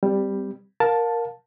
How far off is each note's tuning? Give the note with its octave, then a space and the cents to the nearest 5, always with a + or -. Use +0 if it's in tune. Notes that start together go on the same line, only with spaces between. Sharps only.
G3 +5 C4 -25
A#4 +0 F5 +30 A5 +0